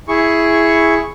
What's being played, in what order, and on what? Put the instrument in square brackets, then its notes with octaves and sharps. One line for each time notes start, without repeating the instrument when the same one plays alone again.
[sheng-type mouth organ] E4 G#4 C#6